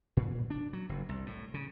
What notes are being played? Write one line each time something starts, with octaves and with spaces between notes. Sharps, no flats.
A#2
D4
F#3
F#1
C2
A2
C#3